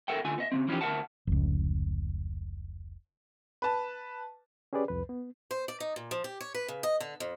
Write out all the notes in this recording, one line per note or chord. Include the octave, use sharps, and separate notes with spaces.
A4 A#4 E5 F#5 G5
D2 D3 F4 G#5
B3 D#5 E5
C#3 F3 C4
E3 F3 C#4 D#4 G4
D2 A#4 E5 F#5 A5
F1 C#2
B4 A5
C#4 G4 G#4 B4 D5
C2 F2 B4
B3
C5
D5
D#4
A#2
F3
G4
C#5
B4
C#3
D#5
D3
F2